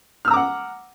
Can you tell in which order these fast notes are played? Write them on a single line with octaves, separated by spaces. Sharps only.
F6 E6 A#5 D6 F#5